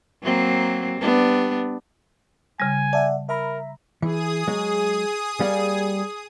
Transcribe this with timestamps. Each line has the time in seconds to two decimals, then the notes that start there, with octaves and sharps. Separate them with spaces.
0.23 F#3 A#3 C4
0.99 G3 B3 D4
2.60 C#3 G3 G#5
2.93 D5 E5 F#5 A5
3.29 A#4 E5 A#5 B5
4.02 E3 G#4 D#6
4.48 F#3 G#3
5.40 G3 A#3 F5